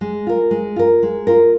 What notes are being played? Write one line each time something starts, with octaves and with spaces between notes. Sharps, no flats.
G#3
F4 A#4
G#3
F4 A#4
G#3
F4 A#4